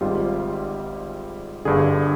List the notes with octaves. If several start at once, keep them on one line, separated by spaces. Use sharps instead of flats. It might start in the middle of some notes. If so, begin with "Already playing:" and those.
G#1 G#2 G3 F4
G1 G2 D3 G#4